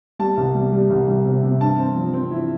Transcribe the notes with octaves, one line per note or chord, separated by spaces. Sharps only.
G3 A5
C2
G3
G3
C2
C2
C3
C3
G2 A5
C4
F3
C4
E4